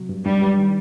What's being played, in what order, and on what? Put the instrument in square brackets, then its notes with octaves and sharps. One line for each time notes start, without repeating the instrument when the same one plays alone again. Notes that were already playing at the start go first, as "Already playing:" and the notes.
Already playing: [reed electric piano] C3 F#3
G2
[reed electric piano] G2 [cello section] G3
[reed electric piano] G2
D#3